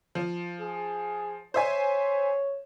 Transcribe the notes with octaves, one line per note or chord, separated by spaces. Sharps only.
F3
G#4
C5 C#5 E5 G#5